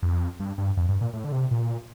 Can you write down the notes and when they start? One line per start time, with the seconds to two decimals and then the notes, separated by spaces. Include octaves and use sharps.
0.03 F2
0.40 G2
0.58 G2
0.77 F2
0.89 G2
1.01 A#2
1.13 A2
1.24 D3
1.32 C3
1.51 A#2